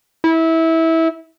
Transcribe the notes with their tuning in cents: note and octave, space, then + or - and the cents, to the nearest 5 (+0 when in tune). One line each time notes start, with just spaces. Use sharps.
E4 -20